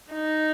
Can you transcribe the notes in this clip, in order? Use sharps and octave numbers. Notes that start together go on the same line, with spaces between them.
D#4